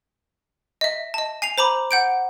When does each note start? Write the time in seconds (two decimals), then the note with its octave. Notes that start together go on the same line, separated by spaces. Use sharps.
0.81 D#5 E5
1.14 D#5 A5
1.42 G#5 C7 F7
1.58 C5 A#5 B5 D6
1.91 F#5 G6 D7